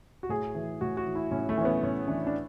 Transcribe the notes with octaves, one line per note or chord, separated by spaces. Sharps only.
F#4
A2 G#4
E3
A2 F#4
F#4
E3
E4
A2 C#4
A3
E3 C#4
B3
A2 C#4
E3 D4
D4